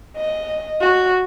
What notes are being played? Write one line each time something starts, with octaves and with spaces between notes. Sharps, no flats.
D#5
F#4